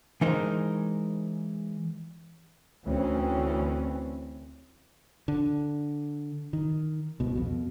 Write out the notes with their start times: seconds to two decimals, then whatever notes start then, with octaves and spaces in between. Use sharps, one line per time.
0.21 E3 G#3 D#4 A#4 C5
2.84 D2 E3 C4 C#4
5.28 D3
6.53 D#3
7.20 C2 B2
7.35 F2 B2